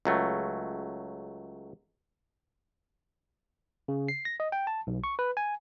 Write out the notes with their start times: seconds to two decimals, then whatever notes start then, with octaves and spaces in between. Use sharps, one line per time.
0.05 C#2 F#3 A3
3.88 C#3
4.08 C7
4.25 A#6
4.40 D#5
4.52 G5
4.67 A5
4.87 B1
5.04 C#6
5.19 B4
5.37 G#5